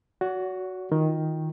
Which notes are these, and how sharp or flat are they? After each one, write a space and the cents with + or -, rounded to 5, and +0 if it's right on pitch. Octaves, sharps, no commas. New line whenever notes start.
F#4 +0 C#5 +45
D#3 +10 F4 +0